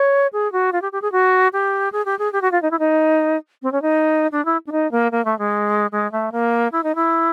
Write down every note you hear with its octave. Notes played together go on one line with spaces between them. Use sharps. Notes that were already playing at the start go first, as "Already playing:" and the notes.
Already playing: C#5
G#4
F#4
F4
G4
G4
G#4
F#4
G4
G#4
G4
G#4
G4
F#4
F4
D#4
E4
D#4
C4
C#4
D#4
D4
E4
D4
D#4
A#3
A#3
A3
G#3
G#3
A3
A#3
E4
D#4
E4